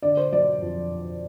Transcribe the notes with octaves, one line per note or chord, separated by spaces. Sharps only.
D3 D5
C5
F#3 D5
F2